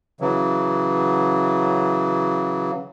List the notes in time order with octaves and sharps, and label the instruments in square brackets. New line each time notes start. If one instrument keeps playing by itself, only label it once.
[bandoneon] C#3 E3 F#3